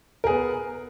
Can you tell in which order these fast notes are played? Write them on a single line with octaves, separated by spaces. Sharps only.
A#4 G#4 B3